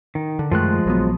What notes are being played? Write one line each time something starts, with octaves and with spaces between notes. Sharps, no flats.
D#3
D3
F#2 D#3 F3 G#3 A3 F#6
A#1 F#3 B3